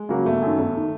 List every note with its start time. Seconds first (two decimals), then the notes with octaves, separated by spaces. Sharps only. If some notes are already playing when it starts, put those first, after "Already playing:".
Already playing: G#3
0.09 C#3 F#3 A#3
0.25 G1 A3
0.42 F#2 D#3
0.58 G1
0.77 D#3